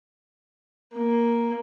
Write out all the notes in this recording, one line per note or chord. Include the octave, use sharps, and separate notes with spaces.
A#3